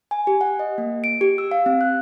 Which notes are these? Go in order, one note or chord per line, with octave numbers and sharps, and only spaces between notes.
G#5
G4
F#5
D#5
A#3
D7
G4
E6
F5
C4
F#6